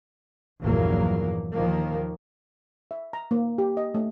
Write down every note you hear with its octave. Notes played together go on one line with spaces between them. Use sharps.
A#1 E2 G2 F#3 A#3
D#2 D#3 F3 A#3
E5
A#5
A#3
G4
D#5
A3